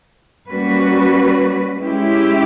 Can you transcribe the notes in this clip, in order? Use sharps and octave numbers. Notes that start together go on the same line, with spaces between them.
G3 A#3 C#4 F#4 B4
G#3 C#4 E4 G4